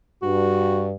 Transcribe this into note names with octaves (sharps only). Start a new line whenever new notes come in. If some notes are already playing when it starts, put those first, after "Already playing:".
G2 F#4